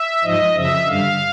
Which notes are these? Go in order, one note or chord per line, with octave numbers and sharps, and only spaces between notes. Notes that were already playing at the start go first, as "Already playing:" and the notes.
Already playing: E5
G#2 F3 D#5
F#2 C#3 F3 E5
G2 D3 G3 F5